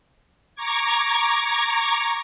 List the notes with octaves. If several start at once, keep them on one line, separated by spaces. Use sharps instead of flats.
A#5 C#6 D6 G#6